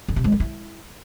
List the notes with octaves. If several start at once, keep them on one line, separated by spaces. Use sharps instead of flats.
D3
C3
G#3
D3
E4